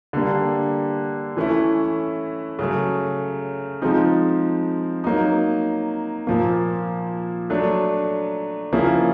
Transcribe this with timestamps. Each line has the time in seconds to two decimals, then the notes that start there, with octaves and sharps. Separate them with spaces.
0.13 D3 G3 A#3 D4
1.37 E3 A3 C#4 E4
2.59 C#3 F#3 A3
3.82 F3 G#3 C4 D#4
5.04 F#3 A#3 D#4
6.27 A#2 F3 A#3
7.50 F#3 A3 D4
8.72 C#3 F3 A#3 C#4 E4